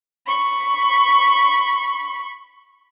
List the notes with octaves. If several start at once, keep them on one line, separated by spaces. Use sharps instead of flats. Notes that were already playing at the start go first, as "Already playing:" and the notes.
B5 C#6